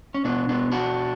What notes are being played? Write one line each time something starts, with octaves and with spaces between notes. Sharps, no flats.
C#4
B2 B3 D4
B3 D4
D4 F#4